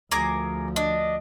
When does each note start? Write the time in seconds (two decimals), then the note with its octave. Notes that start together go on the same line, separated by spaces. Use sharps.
0.11 D2 F3 G#4 A#4 D6
0.76 D4 D#5